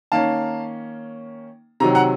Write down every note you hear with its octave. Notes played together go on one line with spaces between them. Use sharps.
D#3 A#3 C#4 F5 A5
C3 D#3 F#3 A#5
F#5 A#5